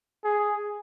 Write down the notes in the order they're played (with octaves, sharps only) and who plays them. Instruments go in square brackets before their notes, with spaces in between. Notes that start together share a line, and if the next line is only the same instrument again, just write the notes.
[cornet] G#4